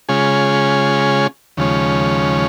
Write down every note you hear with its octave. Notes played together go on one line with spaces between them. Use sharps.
C#3 G#3 C#4 F4 G#4
D#2 C#3 F3 G#3 C#4